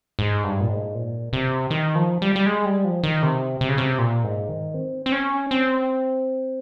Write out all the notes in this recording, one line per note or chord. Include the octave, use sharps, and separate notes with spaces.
G#2
G2
A#2
G#2
A#2
C3
D#3
F3
G3
G3
G#3
G3
F3
D#3
C3
C3
C#3
C3
A#2
G#2
D#3
C4
C4
C#4
C4